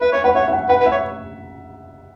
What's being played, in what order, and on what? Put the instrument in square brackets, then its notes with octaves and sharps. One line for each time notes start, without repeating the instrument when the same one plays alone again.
[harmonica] B4 [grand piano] E5
[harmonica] C#5 [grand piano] E5
[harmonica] B4 [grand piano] F#5
[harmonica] C#5 [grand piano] E5
[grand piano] E5
F#5
[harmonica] B4 [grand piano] F#5
[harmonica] B4
[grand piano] E5
[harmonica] C#5